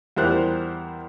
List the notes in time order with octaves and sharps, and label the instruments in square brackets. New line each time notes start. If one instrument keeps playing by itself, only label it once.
[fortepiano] E2 G3 E4 A#4 C5 F#6